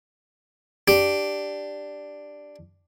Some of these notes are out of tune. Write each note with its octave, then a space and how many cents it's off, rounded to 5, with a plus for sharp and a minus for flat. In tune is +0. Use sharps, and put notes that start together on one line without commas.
D4 +0 G4 +0